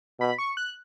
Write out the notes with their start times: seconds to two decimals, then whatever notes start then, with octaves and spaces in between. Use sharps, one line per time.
0.20 B2 B5
0.38 C#6
0.57 F#6